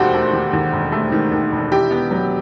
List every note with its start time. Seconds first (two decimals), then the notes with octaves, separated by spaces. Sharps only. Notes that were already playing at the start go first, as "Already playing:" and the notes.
Already playing: E1 D#2 D#3 A3 F#4 G4 C5
0.14 A3
0.33 D#3
0.53 D#2
0.73 E1
0.92 A3
1.12 D#3
1.32 D#2
1.52 E1
1.72 E4 G4
1.91 B3
2.11 F#3